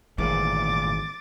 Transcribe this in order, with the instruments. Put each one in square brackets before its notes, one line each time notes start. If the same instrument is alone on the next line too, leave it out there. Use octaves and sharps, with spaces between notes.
[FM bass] G#1 [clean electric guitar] D2 G2 A#2 [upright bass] E3 [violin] D6 A6